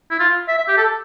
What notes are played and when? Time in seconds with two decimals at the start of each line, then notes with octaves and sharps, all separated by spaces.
0.11 E4
0.20 F4
0.48 E5
0.58 E5
0.68 G4
0.77 A4